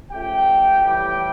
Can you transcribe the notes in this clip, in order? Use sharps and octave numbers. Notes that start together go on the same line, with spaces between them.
C#3 F3 A3 G4 G5
A2 E3 G3 G4 G5